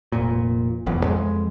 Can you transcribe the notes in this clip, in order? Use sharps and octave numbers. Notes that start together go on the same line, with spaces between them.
F1 A#2
F1 B1 E2
F2 G#3